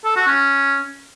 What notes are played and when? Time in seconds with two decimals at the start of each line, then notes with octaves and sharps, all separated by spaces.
0.05 A4
0.16 F#4
0.28 C#4